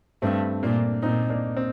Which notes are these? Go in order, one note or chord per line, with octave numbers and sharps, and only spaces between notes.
G2 A3 C4
A#2 A#3 D4
A#2 C4 D#4
A#3 D4
C4